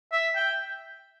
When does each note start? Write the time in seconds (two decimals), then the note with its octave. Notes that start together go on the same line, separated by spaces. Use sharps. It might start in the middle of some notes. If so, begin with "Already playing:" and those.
0.12 E5
0.36 G5